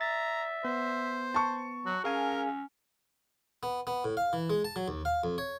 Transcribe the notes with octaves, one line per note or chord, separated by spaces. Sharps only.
E5 A#5 A6
B3 C5
A5 C#6
F#3 F#4
C#4 G#4 A#4 F5 G#5
B3
B3
A2
F5
E3
G#3
A5
F#3
D#2
F5
F2
C#5